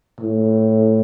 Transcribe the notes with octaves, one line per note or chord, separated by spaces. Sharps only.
A2